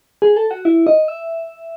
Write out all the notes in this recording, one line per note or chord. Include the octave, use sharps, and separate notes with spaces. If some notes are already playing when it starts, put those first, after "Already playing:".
G#4
A4
F#4
E4
D#5
E5